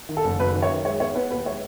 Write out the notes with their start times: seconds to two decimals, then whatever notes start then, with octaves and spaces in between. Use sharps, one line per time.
0.09 D#3
0.17 A4
0.24 F#1
0.39 F#2 B4
0.54 D#3
0.62 C#5
0.70 D#3
0.85 G#3 C#5
1.00 B3 C#5
1.15 B3 B4
1.30 D#2 B4
1.46 G#3 C#5